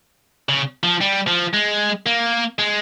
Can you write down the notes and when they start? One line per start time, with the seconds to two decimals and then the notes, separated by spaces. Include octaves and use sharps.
0.49 C#3
0.83 F3
1.01 G3
1.28 F3
1.54 G#3
2.06 A#3
2.59 G#3